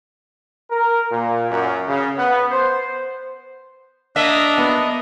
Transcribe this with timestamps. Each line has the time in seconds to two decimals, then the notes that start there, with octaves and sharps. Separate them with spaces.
0.71 A#4
1.11 A#2
1.51 F#2
1.88 C#3
2.18 B3
2.51 C5
4.16 A#3 D4 D#5 E5
4.58 B3